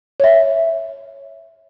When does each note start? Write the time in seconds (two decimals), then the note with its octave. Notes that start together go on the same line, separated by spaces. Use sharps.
0.20 C#5 E5